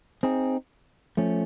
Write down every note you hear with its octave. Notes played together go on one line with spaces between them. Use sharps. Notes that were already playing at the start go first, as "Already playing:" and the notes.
C4 D#4 G#4
F3 A3 C#4